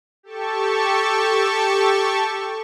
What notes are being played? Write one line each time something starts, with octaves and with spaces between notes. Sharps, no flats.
G4 A4 A5 C#6